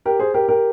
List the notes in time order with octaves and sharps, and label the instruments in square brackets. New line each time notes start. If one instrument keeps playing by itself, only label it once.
[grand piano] G4 A#4
G#4 C5
G4 A#4
G4 A#4